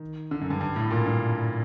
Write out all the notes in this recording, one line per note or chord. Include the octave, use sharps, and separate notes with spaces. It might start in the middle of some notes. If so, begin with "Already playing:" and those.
Already playing: D#3
D3
F#2
G2
G2
A2
A#2
G2